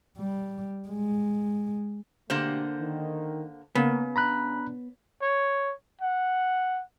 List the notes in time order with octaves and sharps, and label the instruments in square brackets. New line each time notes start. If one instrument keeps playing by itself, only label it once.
[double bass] G3
G#3
[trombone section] B2 A3 G4 [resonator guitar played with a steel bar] D3 A#3 C5
[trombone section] D#3
[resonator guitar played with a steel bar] C#3 [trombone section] A#3 [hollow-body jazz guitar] B3
[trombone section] D4 [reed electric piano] A#5 B5 F#6
[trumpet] C#5
F#5